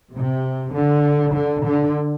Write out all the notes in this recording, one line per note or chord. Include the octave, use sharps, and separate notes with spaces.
C3
D3
D3
D3